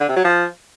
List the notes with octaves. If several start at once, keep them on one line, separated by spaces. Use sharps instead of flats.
D3
C3
F#3
F3